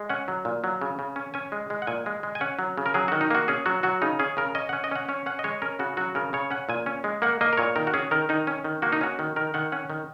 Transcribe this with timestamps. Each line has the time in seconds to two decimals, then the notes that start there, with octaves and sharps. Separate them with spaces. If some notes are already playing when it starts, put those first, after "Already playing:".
Already playing: G#3
0.10 C#4 F#5
0.28 F#3
0.45 A#2
0.64 F#3
0.81 C#3
0.99 C#3
1.16 C#4
1.34 C#4 G#5
1.52 G#3
1.70 G#3
1.82 F#5
1.87 A#2 G#5
2.06 G#3
2.23 G#3
2.35 G#5
2.41 C#4 F#5
2.59 F#3
2.78 C#3
2.86 A#4
2.94 F#3 G#4
3.08 D#3 F#4
3.21 D#4
3.31 A#3 F#4
3.48 C#4 G#4
3.66 F#3 F#4
3.83 F#3 F#4
4.02 C#3 D#4
4.19 C#4 G#4
4.37 C#3 A#4
4.55 C#4 D#5
4.69 C#4 F#5
4.84 D#5
4.91 C#4 F#5
5.09 C#4 C#5
5.26 C#4 F#5
5.39 D#5
5.44 G#3 C#5
5.62 C#4 A#4
5.79 C#3 F#4
5.97 F#3 F#4
6.15 C#3 A#4
6.33 C#3 C#5
6.51 C#4 F#5
6.69 A#2 G#5
6.86 C#4
7.04 G#3
7.22 A#3 F#5
7.41 A#3 D#5
7.53 A#4
7.58 A#2 C#5
7.76 D#3 A#4
7.87 F#4
7.94 C#4 G#4
8.11 D#3 A#4
8.29 D#3 D#4
8.47 C#4
8.64 D#3
8.82 A#3 F#4
8.92 D#4
9.01 C#4 F#4
9.19 D#3
9.36 D#3 A#4
9.54 D#3 F#5
9.72 C#4 F#5
9.90 D#3